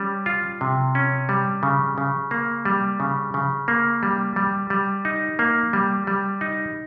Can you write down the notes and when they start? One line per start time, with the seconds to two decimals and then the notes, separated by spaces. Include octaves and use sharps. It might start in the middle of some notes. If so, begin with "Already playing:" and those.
Already playing: G3 C#4
0.26 F4
0.61 C3
0.95 C#4
1.29 G3
1.63 C#3
1.98 C#3
2.31 A#3
2.65 G3
3.00 C#3
3.34 C#3
3.68 A#3
4.03 G3
4.36 G3
4.70 G3
5.05 D#4
5.39 A#3
5.73 G3
6.07 G3
6.41 D#4